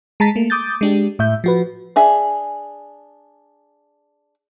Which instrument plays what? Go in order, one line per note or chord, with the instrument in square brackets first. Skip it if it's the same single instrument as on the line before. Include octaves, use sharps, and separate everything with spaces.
[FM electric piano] G#3 A5 A#5 A6 B6
A3 A#3
D6 D#6 G6 A6
G#3 D4 G4
A2 E5 G6
F3 F#4 B4
[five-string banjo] D4 G#4 E5